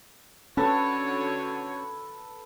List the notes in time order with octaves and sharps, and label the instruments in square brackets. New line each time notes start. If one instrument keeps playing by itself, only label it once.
[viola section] D3 F#4 C#5 [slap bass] C#4 [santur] A4 B4